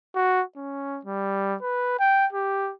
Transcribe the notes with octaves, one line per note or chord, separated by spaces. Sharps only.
F#4
C#4
G3
B4
G5
G4